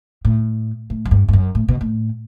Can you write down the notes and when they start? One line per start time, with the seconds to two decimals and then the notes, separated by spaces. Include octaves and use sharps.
0.25 A2
0.90 A2
1.05 F#2
1.11 G2
1.28 G2
1.33 F#2
1.55 A2
1.68 B2
1.81 A2